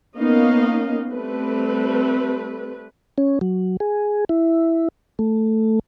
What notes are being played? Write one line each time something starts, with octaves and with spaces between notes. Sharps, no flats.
A#3 B3 C#4 D#4 D#5 F5
G3 A3 C4 B4
C#4
F#3
G#4
E4
A3